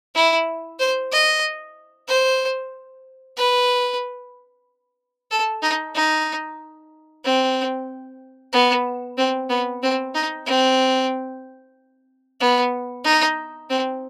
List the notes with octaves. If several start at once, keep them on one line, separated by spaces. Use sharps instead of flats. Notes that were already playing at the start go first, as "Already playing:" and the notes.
E4
C5
D#5
C5
B4
A4
D#4
D#4
C4
B3
C4
B3
C4
D#4
C4
B3
D#4
C4